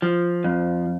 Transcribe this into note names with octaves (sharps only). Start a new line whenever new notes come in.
F3
F2